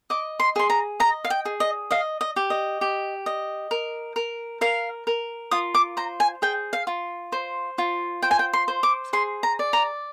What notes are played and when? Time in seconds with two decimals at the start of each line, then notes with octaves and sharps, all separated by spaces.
0.10 D#5 D6
0.40 C6
0.56 G#4 C6
0.70 A#5
1.00 D#5 A#5
1.24 F5
1.30 G5
1.45 G#4
1.60 D#5
1.91 D#5 F5
2.21 D#5
2.36 G4
2.50 D#5
2.81 G4
3.26 D#5
3.71 A#4
4.16 A#4
4.61 A#4 F5
5.07 A#4
5.51 F4 D#6
5.75 D6
5.97 C5 A#5
6.20 G#5
6.42 G#4 G5
6.73 F5
6.87 F4
7.32 C5
7.78 F4
8.22 C5 G5
8.31 G#5
8.39 G5
8.53 C6
8.68 C5
8.83 D6
9.13 G#4 C6
9.43 A#5
9.59 D5
9.73 A#5